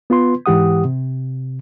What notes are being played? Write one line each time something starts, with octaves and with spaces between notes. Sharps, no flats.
B3 F4 B4 C6
G#2 E3 G4 F#5 D#6
C3